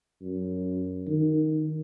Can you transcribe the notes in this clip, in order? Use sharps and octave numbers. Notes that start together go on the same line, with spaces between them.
F#2
D#3